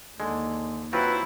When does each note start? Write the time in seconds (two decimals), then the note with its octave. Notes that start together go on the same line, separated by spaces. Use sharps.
0.20 D#2 D3 G#3
0.93 F#3 C4 E4 F4 B4